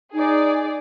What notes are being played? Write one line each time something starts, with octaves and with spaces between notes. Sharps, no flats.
D#4 G#4 D5